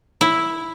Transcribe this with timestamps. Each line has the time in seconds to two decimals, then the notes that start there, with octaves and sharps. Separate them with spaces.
0.21 E4